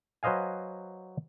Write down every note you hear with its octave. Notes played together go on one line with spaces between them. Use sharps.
F#3 B4 C5 D#5 F5 G#5